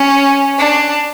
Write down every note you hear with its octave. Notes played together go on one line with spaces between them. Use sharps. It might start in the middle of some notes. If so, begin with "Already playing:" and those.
Already playing: C#4
D4